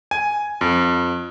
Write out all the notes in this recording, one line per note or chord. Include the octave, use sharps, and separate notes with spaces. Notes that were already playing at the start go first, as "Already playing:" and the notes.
G#5
F2